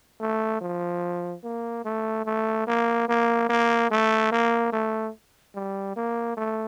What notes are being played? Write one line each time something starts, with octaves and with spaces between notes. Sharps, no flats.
A3
F3
A#3
A3
A3
A#3
A#3
A#3
A3
A#3
A3
G3
A#3
A3